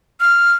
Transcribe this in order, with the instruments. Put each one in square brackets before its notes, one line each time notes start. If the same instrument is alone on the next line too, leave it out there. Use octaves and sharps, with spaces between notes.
[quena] F6